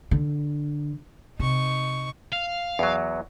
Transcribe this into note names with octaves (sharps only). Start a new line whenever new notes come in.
D3
C3 D#4 C#6
F5
E2 F#3